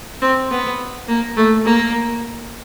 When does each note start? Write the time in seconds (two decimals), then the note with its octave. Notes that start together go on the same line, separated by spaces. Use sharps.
0.22 C4
0.51 B3
1.08 A#3
1.37 A3
1.65 A#3